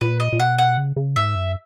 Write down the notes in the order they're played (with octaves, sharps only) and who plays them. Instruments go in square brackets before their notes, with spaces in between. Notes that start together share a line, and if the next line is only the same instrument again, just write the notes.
[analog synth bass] A#2 [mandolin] B4
[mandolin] D#5
[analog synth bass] A#2
[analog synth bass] B2 [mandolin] F#5
[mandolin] F#5
[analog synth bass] C#3
C#3
[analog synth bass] G#2 [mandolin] E5
[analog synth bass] F#2